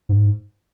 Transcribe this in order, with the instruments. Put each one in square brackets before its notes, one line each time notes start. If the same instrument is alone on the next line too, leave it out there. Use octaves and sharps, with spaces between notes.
[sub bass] G#2